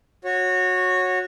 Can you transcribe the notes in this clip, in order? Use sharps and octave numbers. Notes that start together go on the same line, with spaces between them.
F#4 C#5